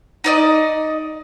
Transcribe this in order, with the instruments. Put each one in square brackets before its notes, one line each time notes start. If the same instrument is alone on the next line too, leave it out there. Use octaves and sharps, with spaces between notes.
[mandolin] D#4 D5 D#5